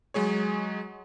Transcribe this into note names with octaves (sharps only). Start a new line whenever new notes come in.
F#3 G#3 G#4 C#5